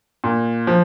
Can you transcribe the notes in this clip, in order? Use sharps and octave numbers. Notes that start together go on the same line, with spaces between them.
A#2
F3